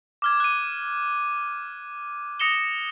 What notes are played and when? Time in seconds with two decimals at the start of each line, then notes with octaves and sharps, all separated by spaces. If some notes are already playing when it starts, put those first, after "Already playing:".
0.22 D6 F6 G#6
0.40 F#6 D#7
2.40 D#6 A#6 C#7 E7 G7